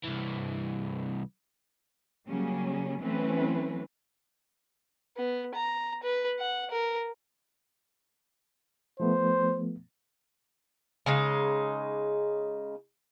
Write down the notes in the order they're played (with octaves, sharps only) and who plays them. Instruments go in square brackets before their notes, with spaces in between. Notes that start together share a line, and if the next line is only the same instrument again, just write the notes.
[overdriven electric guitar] C2 E3
[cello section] C#3 F#3 G3 A#3 C#4
E3 F#3 A3 C4 C#4 B4
[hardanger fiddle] B3
A#5
B4
F#5
A#4
[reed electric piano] F3 A3 B3 [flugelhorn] C5
[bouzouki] C#3 G#3 D#4